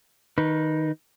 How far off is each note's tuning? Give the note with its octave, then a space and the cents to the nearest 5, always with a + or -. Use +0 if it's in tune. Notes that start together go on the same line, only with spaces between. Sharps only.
D#3 +0 D#4 +0 B4 -20